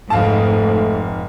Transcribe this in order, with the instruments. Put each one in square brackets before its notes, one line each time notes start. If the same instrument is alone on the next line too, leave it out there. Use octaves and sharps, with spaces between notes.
[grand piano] F1 F5 A5 [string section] G#2 [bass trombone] A3